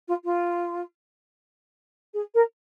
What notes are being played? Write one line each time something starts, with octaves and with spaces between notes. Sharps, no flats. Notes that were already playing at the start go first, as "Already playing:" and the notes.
F4
F4
G#4
A#4